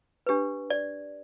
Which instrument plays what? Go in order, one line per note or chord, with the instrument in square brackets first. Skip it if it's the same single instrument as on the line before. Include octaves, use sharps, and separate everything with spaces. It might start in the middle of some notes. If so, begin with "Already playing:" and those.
[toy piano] D4 G4 B4
D5